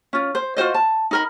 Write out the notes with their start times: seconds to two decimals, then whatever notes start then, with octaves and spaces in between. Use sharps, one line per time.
0.13 C#4 F4
0.35 C5
0.56 F4 F#4 C5 D#5
0.74 A5
1.11 D#4 A#4 B5